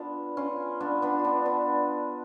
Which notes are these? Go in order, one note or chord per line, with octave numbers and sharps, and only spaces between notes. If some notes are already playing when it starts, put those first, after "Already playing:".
Already playing: B3 D4 F4
C#4 F4
B3 D4
B3 D4
F4
B3 D4
B3 D4